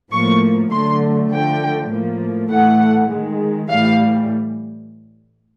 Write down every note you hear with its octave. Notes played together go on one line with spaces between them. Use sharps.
A2 F3 A#3 C#6
D3 F#3 A3 C6
D3 F3 A3 G5
A2 F3 A#3
A2 E3 A3 F#5
D#3 G#3
A2 E3 G3 F5